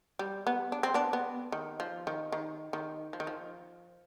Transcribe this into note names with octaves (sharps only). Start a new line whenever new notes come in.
G3
B3
D4
C4
B3 D4
B3
D#3
F3
D#3
D#3
D#3
F3
D#3
F3